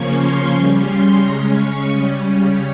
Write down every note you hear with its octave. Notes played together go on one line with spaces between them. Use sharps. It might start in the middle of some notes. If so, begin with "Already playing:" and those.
Already playing: C#3 F3 A#3 C#4 C#6
C6
C#3 G3 C#4
C6
C#3 G#3 C#4 A#5
C#6
C#3 G3 C#4